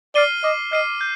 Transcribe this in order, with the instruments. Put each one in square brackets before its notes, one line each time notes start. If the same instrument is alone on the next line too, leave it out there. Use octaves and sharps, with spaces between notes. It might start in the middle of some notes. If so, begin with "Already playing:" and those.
[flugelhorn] D5 [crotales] F6 C7 D#7 G7
[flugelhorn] D#5 [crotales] D6
[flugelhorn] D#5 [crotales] F6 C7 D#7 G7
[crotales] G6